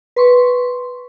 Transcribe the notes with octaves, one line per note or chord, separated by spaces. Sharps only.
B4 C6 C#6